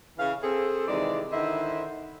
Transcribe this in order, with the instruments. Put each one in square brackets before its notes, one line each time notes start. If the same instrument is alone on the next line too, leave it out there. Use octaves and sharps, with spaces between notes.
[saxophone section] C#3 E3 F5
C4 G#4 A4
C3 D#3 E3 G#3 D5
D3 D#3 E4 C5 D#5 E5